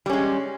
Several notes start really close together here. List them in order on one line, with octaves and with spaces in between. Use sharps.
G3 C#4 G#3